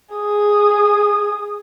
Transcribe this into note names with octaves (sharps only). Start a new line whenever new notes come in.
G#4 D#6